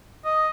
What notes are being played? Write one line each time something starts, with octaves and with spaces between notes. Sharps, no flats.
D#5